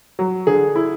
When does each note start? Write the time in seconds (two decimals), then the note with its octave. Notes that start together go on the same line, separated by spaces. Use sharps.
0.19 F#3
0.47 D3 G#4
0.76 E4